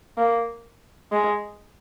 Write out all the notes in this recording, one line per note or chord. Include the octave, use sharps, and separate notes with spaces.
A#3
G#3